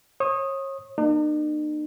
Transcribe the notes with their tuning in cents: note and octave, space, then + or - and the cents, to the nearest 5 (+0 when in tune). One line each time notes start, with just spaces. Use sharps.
C#5 -35 D#6 +0
A#3 +0 D#4 -45